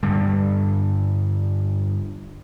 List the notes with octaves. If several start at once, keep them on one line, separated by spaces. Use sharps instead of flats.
G2 D3 G3